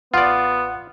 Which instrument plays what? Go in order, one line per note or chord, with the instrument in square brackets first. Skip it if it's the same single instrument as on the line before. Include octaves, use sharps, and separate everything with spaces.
[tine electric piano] A1 F#5 [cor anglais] B3 [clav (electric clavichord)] F4 D5